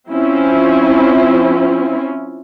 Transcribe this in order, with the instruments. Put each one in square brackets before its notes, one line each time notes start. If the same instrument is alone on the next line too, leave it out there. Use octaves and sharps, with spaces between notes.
[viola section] F3 C4 C#4 E4 F4